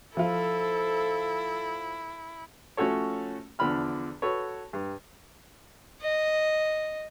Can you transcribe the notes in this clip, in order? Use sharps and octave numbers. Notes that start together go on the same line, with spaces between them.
F3 E4 F4 A4
F3 A3 C#4 F#4 A4 C#5
E2 D3 F3 D4 B5 F6
F#4 A4 B4 C#5
G2
D#5